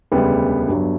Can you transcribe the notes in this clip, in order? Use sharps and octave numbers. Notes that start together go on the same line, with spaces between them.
E1 D2 C#3 G3 B3
G1 G2 F#3